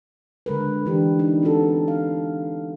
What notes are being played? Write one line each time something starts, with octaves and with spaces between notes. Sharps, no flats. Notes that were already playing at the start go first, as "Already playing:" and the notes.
D3 G#3 A#4 B4
E3 D4 G4
D#4
B3 C4 D4 F#4 A4
F5